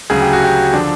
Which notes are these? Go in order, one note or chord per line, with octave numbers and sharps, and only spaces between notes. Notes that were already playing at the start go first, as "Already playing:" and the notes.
D2 C#3 F#3 G#4
G4
F#4
G4
D3 F3 D4